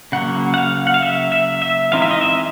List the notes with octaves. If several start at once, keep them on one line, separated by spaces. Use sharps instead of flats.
C#3 F#3 A#3 F#5
F#5
F5
F#5
F5
E5
E5
E5
E3 G#3 C4 D#4 F5
E5
D#5
E5